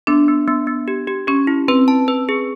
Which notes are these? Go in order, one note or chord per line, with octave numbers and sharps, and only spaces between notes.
B3 D4
B3
B3
B3
G4
G4
C#4 G4
E4
C4 B4
A5
B4
G#4